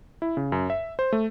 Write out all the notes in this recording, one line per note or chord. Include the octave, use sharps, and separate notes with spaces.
E4
C#3
F#2
E5
C5
A3